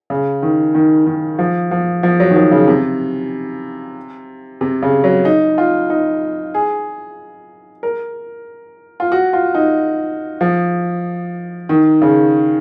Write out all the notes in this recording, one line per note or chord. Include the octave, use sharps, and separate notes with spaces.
C#3
D#3
D#3
D#3
F3
F3
F3
F#3
D#3
F3
C#3
C3
C3
C#3
F#3
D#4
F4
D#4
G#4
A#4
F4
F#4
F4
D#4
F3
D#3
C#3